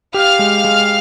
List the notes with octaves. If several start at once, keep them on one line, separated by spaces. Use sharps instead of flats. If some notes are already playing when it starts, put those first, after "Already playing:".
G4 F5 F6
G#3
G#3